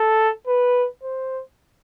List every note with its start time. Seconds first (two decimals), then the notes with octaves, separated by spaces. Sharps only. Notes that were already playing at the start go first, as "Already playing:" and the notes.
Already playing: A4
0.47 B4
1.03 C5